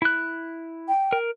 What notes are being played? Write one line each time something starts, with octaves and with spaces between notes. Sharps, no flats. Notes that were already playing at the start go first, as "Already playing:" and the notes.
E4 F#6
G5
A#4